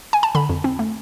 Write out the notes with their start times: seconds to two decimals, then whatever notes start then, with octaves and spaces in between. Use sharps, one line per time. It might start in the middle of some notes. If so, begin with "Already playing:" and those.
0.13 G#5
0.23 A5
0.35 D3 B5
0.49 F2
0.64 C4
0.79 A3